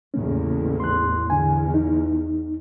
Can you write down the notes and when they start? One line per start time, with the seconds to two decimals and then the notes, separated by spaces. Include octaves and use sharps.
0.14 A1 E2 A2 C#3 A#3 C#4
0.80 C6 F#6
1.30 E2 D3 G#5
1.74 D#4